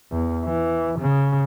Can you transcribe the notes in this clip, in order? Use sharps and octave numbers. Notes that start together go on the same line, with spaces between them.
E2
E3
C#3